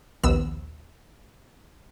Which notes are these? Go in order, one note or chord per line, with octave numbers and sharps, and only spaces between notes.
A#1 D#2 B3 E6